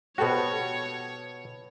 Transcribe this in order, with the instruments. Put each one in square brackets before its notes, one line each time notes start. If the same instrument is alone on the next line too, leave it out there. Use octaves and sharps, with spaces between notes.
[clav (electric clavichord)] B2 F#4 [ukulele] G4 A4 C5 [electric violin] C#5